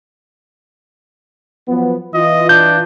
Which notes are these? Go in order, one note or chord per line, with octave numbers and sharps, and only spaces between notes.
F3 F#3 B3
E3 F4 D#5
D4 G6